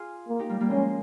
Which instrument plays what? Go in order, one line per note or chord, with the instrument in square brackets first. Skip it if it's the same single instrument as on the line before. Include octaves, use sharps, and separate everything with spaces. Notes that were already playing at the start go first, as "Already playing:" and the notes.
Already playing: [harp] F4 G#4
[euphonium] A#3
[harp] D#4 G4
G3 A#3
G3 A#3
[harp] F3 G#3 [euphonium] C#4